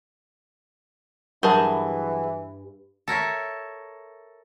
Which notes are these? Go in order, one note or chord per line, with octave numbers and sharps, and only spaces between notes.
G2 E3 F#3 G#4 A#4 A5
A4 A#4 C#5 E5